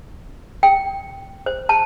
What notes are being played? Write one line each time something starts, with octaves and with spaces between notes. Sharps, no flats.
G5
C5
A5